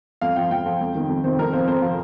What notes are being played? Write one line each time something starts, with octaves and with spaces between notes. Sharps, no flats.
F2 F5
F3 G5
F2 G5
F3
F2
C3 D#3
F2
C3 D#3 C5
F2 A#4
C3 F3 C5
F2 C5
C3 F3